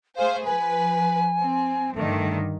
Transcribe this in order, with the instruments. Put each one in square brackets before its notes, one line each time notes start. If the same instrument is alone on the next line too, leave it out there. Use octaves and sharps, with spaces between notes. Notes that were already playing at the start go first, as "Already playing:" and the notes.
[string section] A3 G#4 C5 [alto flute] F5
[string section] F3 B4 [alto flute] G#5
[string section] C4
[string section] G2 D3 D#3 [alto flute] A3